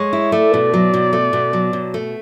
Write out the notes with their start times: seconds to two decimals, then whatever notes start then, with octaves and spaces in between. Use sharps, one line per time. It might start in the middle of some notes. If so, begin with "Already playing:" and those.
Already playing: G#3 C#5
0.13 E4
0.32 A3 D5
0.54 B2
0.74 F#3
0.94 B2
1.13 A3
1.33 B2
1.53 F#3
1.73 B2
1.94 A3